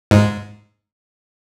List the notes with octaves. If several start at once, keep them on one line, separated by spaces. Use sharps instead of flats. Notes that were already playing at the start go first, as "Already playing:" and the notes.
G#2